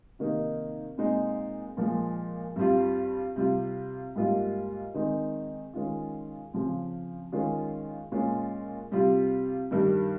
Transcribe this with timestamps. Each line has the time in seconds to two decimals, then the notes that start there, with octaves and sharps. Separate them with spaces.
0.19 C3 D#3 A#3 D#4
0.98 A#2 G#3 C4 D#4
1.77 A#2 F3 G#3
2.56 G2 G3 C4 F4
3.36 C3 G3 C4 F4
4.16 G#2 G3 A#3 F4
4.94 D#3 G#3 C4 D#4
5.74 D#3 G#3 C#4 F4
6.53 C#3 F3 C4
7.32 D#3 G#3 C#4 F4
8.12 A#2 G#3 C#4 F4
8.91 C3 G3 C4 F4
9.71 G2 D#3 G3